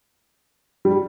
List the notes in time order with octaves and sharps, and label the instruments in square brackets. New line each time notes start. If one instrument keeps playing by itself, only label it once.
[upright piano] G3